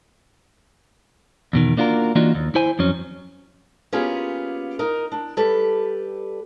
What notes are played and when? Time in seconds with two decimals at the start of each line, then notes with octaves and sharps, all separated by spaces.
1.53 E2 B2 D#3
1.77 A#3 D4 F4 F#4 A#4
2.15 E3 A#3 D4 D#4 F4 F#4
2.35 D#2
2.55 E4 C5 G#5
2.79 F2 F#3 C#4
3.93 A#3 B3 C#4 F4 G4 G#4
4.79 D#4 A#4
5.12 D4
5.37 G3 G4 A4 B4